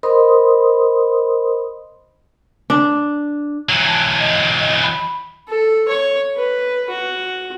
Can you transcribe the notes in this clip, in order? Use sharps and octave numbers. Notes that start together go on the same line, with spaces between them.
A#4 C5 D#5 B5 C6 D#6
D4
E3 F#3
A5
D#5
D#5
B5
A4
C#5
B4
F#4